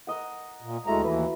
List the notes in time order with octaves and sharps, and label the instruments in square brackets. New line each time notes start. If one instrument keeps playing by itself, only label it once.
[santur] A#4 D#5 F#5
[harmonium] A#2
[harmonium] D2 G#3 A#5 [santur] F#3 A3 E4
[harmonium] D#2 E3 [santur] B4 A#5